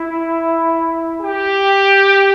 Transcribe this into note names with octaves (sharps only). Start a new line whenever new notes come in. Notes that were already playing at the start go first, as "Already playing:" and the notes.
Already playing: E4
G4